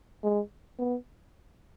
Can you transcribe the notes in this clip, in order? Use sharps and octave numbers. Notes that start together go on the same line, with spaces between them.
G#3
B3